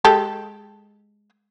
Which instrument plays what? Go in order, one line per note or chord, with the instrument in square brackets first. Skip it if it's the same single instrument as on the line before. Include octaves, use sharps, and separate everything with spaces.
[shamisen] G#3 G4 A4